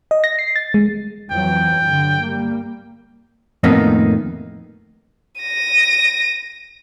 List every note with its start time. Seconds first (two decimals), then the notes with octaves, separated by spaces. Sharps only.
0.11 D#5
0.24 A#6
0.39 C7
0.56 A6
0.74 G#3
1.31 F2 E3 F#3 G5
1.82 G2 D3
2.21 G3 A#3
3.63 F2 A2 D#3 A#3 B3 D#4
5.41 A#6 D#7